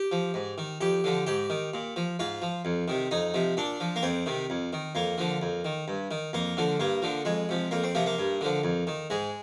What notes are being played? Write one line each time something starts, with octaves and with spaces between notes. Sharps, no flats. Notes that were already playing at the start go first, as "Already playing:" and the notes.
Already playing: G4
F3
G#2
D#3
F2 G4
D3 F3
G#2 G4
D#3
A#2
F3
G#2 F4
F3
F2
C3 D#3
F2 D#4
C3 F3
A#2 D4
F3
A#3
F2 C4
C3 D#3
F2
D#3
F2 A#3
D3 F3
F2
D#3
G2
D#3
F2 A#3
D3 F3
G2 A#3
D3 F3
F2 G#3
C3 F3
F2 A#3
C4
C3 F3 A#3
A#3
G2
D3 F3
F2
D#3
G#2 G#3